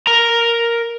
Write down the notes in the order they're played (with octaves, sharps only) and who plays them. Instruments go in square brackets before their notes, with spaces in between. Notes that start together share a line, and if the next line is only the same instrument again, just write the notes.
[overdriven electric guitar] A#4 A#5